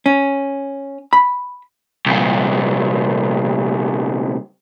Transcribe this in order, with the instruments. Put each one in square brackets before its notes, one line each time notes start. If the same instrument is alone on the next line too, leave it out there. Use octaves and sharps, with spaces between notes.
[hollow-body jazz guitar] C#4
B5
[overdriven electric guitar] C2 A#2